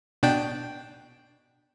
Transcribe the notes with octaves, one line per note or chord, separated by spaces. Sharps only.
B2 D4 G5